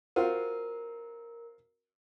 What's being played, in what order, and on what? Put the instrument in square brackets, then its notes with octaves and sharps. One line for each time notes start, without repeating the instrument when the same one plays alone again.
[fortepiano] C4 F4 F#4 [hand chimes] A#4